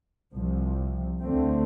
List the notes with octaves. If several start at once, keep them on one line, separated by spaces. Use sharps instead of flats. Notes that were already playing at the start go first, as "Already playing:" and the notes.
C2 C3 F3
D2 D3 A3 C4